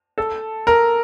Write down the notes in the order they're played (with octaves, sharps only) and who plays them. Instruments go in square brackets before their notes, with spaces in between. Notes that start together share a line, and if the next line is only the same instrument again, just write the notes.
[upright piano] A4
A#4